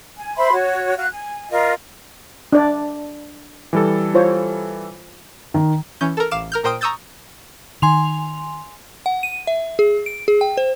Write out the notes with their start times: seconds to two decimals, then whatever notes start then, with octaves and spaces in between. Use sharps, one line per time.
0.17 G#5
0.37 C5 E5 B5 C6
0.52 F#4 C#5
0.97 F#4 F5 F#6
1.11 G#5
1.50 F4 A#4 D#5
2.52 D4 D5
3.73 E3 G3 A4
4.14 F4 C5 C#5
5.54 D#3
6.01 E3 C#4 G6
6.17 A4 A#4
6.31 A1 F5 D6 E7
6.52 A#4 F6 G6
6.63 A#2 A#4 C5 G5 D#6 D7
6.81 A#5 C#6 D#6 E6 G6 A6
7.82 D#3 G#5 C6 F7
9.06 F#5
9.23 D#7
9.47 E5
9.79 G#4
10.06 D7
10.28 G#4
10.41 G5
10.57 C5